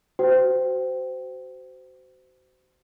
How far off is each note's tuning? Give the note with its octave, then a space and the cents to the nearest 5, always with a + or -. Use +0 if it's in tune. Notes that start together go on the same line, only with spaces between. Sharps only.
F#4 +25 C5 -25 G5 -15